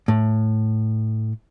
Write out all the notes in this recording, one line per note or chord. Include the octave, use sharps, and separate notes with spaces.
A2